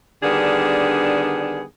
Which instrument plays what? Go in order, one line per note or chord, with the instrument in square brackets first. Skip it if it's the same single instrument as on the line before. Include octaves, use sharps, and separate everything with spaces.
[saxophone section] D3 D#3 G3 B3 D4 G#4